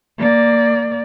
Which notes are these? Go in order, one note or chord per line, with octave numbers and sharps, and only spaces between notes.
A#3 D5